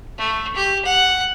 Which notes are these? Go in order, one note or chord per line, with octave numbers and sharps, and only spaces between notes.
A3
G4
F#5